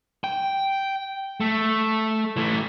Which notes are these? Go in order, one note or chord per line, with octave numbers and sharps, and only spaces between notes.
G5
A3
E3 A3